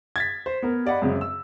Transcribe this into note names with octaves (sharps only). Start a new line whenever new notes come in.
G#6 A6 B6
C5
B3 A#4
G4 D5 D#5 F#5 B5
F#2 C#3 G#3 C4
E6